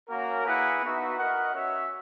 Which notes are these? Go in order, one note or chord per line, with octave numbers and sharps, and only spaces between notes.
A#3 C#4 F#4 A#4
A#3 E4 G#4 B4 F#5
B3 D#4 F#4 B4 E5
F#4 A#4 D#5 F#5
C#4 F#4 C#5 E5